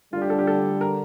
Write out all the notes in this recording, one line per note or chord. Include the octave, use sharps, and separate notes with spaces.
D3 G3 D4 F4
G4
A4
G4
A4
A#4